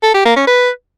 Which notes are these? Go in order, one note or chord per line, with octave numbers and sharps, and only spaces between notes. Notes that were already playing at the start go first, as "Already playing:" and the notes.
A4
G4
A#3
C#4
B4